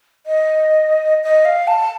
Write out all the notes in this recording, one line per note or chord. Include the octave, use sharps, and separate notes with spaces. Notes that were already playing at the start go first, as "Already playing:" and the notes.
D#5
D#5
F5
A5